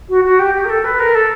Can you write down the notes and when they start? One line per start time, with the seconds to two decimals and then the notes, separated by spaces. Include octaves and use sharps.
0.09 F#4
0.24 F#4
0.39 G4
0.53 G4
0.64 A#4
0.69 A4
0.84 B4
0.99 A#4
1.14 A4